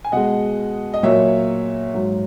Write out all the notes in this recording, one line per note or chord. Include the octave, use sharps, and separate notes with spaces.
G#5
B2 G#3 D#5 F#5
D#5
A#2 F#3 C#5 E5
G#2 F#3